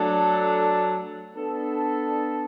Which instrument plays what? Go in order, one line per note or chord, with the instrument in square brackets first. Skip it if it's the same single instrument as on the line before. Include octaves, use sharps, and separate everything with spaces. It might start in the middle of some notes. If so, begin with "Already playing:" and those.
Already playing: [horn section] F#3 A3 D4 A4
B3 D4 A4